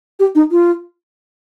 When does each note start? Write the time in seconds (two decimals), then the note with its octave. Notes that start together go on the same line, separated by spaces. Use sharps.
0.20 G4
0.35 D#4
0.52 F4